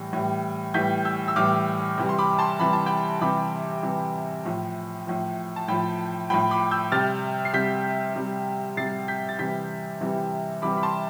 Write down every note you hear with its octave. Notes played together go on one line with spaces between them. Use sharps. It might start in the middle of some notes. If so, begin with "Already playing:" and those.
Already playing: A2 E3 G3
A2 E3 G3
A2 E3 G3 G6 B6
E6 G6
E6
A2 E3 G3 D6 F6
C3 E3 G3
C6
B5 D6
A5 C6
C3 E3 G3 B5
A5
G5 B5
C3 E3 G3 B5 D6
C3 E3 G3
A2 F3
A2 F3
A5
A2 F3 G5 B5
A2 F3 G5 B5
B5 D6
E6 G6
C3 G3 F6 A6
C7
C3 G3 G6 B6
C3 G3
C3 G3 A6 C7
G6 B6
A6
C3 E3 G3 G6 B6
C3 E3 G3
C3 E3 G3 B5 D6
B5
A5 C6